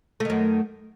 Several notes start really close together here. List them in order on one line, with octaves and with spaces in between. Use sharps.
A3 D#3 F#2